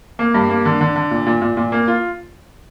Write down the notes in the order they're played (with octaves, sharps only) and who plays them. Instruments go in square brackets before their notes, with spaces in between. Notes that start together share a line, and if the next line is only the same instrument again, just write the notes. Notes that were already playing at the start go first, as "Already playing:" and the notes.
[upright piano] A#3
G2
A#3
D3
D3
D3
A#2
A#2
A#2
A#2
A#3
F4